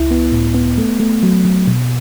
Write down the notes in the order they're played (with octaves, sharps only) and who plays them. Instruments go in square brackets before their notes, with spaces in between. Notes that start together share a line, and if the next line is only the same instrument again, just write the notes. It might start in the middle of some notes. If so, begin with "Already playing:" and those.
Already playing: [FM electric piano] C#2 E4
B3
A2
B3
A3
A3
F#3
F#3
B2